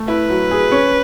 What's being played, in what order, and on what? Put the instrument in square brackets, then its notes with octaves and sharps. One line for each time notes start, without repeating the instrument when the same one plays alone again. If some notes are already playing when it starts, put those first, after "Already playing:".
Already playing: [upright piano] A3
[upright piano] E4 [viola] B4
[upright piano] F#3
G#4
C#4